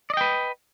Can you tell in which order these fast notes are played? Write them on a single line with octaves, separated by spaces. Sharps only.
D5 D#5 G5 B4